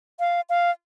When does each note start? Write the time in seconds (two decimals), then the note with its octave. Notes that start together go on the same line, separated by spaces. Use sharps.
0.20 F5
0.50 F5